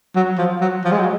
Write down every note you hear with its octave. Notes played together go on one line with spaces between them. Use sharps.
F#3
F3
F#3
F3
G#3
F#3